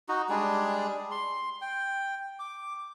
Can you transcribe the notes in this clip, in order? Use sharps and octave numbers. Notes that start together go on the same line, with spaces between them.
D#4 F#4
G3 G#3 D4 G#4
C6
G5
D6